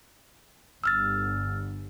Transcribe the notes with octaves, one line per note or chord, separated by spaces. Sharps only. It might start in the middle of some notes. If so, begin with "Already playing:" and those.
G1 E6 F6 A6